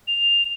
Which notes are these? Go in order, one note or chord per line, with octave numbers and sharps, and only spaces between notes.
F7